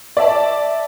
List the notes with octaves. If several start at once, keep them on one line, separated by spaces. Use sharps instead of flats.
D5 E5 A5